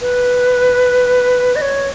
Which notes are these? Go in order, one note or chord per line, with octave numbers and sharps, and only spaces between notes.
B4
D#5
C#5